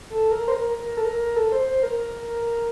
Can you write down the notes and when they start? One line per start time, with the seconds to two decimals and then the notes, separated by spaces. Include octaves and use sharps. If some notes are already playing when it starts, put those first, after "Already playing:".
0.10 A4
0.31 A#4
0.48 C5
0.52 A#4
0.73 A#4
0.97 A4
1.05 A#4
1.36 A4
1.52 C5
1.67 C5
1.83 A#4